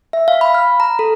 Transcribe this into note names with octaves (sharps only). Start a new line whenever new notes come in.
E5
F5
B5
F6
A#5
A4